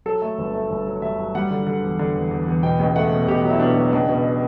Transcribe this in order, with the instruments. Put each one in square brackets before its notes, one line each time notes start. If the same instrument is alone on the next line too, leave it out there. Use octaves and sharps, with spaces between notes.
[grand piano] F#3 A4
A3
G1
A3
G1
F#3
G2 E5
F#3
G3 F#5
D3
D3
E2
D3
E2
E2
E2
B2 G5
C#2
A3 F#5
B2
B2 G4
F#3
E4
B2 D4
F#3
C#2 D4
B2